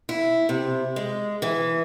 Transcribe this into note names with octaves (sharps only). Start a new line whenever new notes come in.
E4
C3
G#3
E3